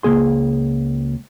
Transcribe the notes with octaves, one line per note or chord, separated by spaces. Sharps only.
C#2 A#3 G#4 C6